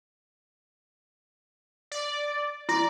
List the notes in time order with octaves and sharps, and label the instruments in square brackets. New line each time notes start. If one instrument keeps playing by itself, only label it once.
[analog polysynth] D5
[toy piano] E4 [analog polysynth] D5